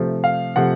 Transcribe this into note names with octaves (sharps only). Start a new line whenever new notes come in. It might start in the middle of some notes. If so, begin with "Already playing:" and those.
Already playing: C3 F3 A3
F5
C3 F3 A3 F#5